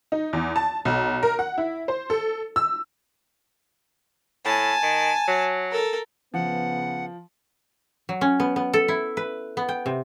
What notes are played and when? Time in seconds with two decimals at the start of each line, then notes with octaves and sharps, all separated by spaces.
0.12 D#4
0.33 E2
0.56 A5
0.85 B1
1.23 A#4
1.39 F#5
1.58 E4
1.88 C5
2.10 A4
2.56 E6
4.45 A2 G#5 A5
4.83 D#3
5.28 F#3
5.72 A4 A#4
6.34 C#3 F3 B3 F#5
8.09 F#3
8.21 C#4
8.40 B3
8.56 B3
8.74 A4
8.88 E4
9.17 B4
9.57 B3
9.69 G5
9.86 C3